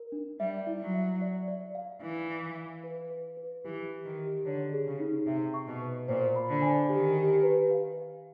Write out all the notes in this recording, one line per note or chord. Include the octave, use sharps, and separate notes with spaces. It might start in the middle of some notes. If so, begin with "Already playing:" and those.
Already playing: A#4
D4
G3 E5
E4
F#3
E5
D5
D5
F5
E3 E4
E4
F5
B4
B4
B4
E3 G4
G4
D#3
G4
D3 C#5
G#4
C#3
D#4
C3 E5
C#6
B2
B4
A#2 C5
B5
D3
G#5
D#3 G4
G4
B4
F5
F5